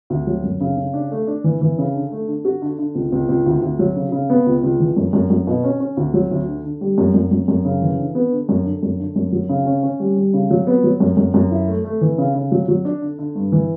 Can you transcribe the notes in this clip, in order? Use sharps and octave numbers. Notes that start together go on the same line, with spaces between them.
D2
F#3
F#2
C#3
C#3
D4
A3
D4
E3
E3
C#3
D3
A3
D3
F#4
D3
D3
C#2
C#2
C#2
D2
D2
F#3
C#3
C#3
B3
C#2
C#2
E3
F#2
F#2
F#2
B2
C#4
C#4
D2
F#3
D2
D3
D3
G3
F#2
F#2
F#2
F#2
C#3
E3
D3
B3
D3
F#2
D3
F#2
D3
F#2
F#3
C#3
C#4
C#4
G3
G3
C#3
F#3
B3
F#3
F#2
F#2
F#2
E4
A3
A3
E3
C#3
C#3
F#3
F#3
D4
D3
D3
G2
E3